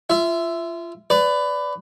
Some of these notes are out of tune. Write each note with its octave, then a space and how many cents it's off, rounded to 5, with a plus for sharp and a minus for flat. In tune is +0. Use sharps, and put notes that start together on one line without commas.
F4 -25 E5 +5
B4 +20 D5 -10